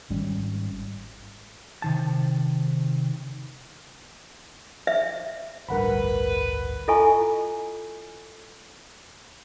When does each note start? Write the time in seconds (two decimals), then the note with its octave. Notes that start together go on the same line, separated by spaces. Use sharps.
0.10 G#1 G#2 G3 C#4
1.82 C3 D#3 A5
4.87 E5
5.69 A1 D2 G2 A#4 B4 F#5 B5
6.88 E4 F4 A4 D#5 G#5 C#6